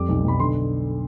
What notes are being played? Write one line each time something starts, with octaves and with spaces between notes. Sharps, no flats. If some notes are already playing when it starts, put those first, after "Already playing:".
Already playing: F2 G3 D6
B1
B1 B5
D3 C6